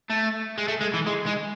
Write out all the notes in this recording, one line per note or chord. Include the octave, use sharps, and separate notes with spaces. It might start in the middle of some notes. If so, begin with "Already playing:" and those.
A3
G#3
A3
G#3
E3
G#3
G#3